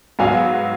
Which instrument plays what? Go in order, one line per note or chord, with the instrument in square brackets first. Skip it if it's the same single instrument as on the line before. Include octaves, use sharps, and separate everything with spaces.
[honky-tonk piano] G#2 F#3 B3 [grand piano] F5 G#5